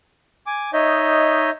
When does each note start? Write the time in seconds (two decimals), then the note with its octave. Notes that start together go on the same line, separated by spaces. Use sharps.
0.47 G#5 D6
0.73 D#4 C#5 D#5 E5 G6